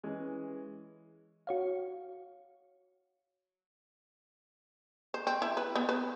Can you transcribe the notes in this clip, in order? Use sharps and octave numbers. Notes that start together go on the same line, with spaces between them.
E3 G#3 C#4
F#4 C#5 F5
C5
C4
E4
B4
B3
B4